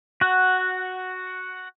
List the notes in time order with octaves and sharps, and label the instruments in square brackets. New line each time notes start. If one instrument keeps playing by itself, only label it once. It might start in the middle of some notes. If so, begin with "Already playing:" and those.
[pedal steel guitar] F#4 F#5